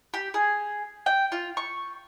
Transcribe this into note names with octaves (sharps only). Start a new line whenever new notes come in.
G4
G#4
G5
F4
C#6